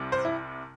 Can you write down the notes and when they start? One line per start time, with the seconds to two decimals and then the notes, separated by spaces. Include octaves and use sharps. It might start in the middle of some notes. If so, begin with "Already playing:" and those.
Already playing: C2 C3 G3
0.12 C5
0.25 E4